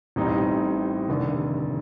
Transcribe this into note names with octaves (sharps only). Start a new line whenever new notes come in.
A1 A2 G3 C4 D#4
F1 D#2 D3